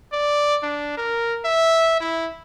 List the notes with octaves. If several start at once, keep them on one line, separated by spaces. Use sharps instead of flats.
D5
D4
A#4
E5
E4